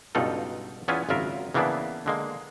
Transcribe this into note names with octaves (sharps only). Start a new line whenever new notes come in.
C#2 G2 B2 D#4 F4 A4
E2 B3 C#4 E4 F4 G#5
G#1 F#2 C#3 F4 A#4 E5
C#3 E3 A#3 B3 D4 E4
D3 G#3 A#3